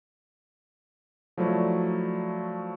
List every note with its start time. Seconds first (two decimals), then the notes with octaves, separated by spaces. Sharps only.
1.37 F3 F#3 A3 E4 D5